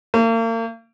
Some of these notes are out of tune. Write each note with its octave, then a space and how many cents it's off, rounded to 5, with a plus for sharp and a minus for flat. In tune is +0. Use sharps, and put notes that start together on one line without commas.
A#3 -40